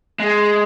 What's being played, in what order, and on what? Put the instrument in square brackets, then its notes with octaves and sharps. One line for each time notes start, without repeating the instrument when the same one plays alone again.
[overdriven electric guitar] G#3